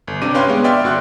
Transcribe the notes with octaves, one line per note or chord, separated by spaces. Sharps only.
G1
G1 C3 D4 D6 D#7
C#4 B4 C#5 F5 G5 C6
G#3 B3
D5 E5 G5 C6 F6
G1 F#4 C6 F#6